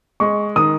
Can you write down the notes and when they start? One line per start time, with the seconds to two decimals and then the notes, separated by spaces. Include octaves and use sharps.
0.20 G#3 C#6
0.56 D#3 D#6